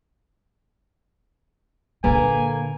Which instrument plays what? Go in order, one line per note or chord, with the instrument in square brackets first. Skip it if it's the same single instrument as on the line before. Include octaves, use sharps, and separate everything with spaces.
[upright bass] A#2 D3 [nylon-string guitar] A#3 A4 B4 [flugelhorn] G#5